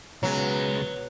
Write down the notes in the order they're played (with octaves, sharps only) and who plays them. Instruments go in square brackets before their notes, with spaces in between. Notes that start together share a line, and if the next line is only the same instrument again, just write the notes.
[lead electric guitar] C#2 G#3 [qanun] B2 B3 E5 [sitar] F#3